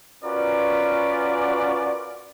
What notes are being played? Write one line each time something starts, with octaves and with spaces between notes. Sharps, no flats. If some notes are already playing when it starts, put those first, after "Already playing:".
C#4 F4 F#4 A#4 B4 D5